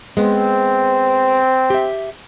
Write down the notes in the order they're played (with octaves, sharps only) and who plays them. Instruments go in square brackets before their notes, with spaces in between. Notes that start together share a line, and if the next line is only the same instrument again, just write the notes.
[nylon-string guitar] G#3 B3 [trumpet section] C4
[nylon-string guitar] G4 E5